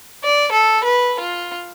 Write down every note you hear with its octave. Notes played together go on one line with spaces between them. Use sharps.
D5
A4
B4
F4